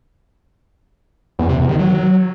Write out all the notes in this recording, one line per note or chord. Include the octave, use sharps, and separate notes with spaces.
E2
C3
E2
D#3
F#3